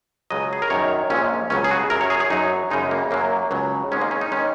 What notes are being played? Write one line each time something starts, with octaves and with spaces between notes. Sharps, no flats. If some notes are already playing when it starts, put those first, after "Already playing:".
C#2 C#3 F#3 D#5
G#4
A#4
F#2 D#3 F#3 C#5
A#1 A#2 G#3 C#4
C#2 C#3 F#3 C#4
G#4
F#4
F#2 F#3 A#4
C#5
G#4
G#4
F#2 F#3 D#4
F#2 C#3 G#3 D#4
A#3
F#2 F#3 A#3
C#2 C#3 F#3
G#1 G#2 G#3 C#4
A#3
C#4
D#4
D#3 G#3 C#4